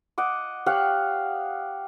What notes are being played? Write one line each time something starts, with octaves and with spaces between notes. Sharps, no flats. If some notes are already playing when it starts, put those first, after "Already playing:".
D#5 F#5 D6
G4 C#5 F5 F#5